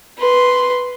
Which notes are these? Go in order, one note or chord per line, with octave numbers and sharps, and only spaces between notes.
B4 C6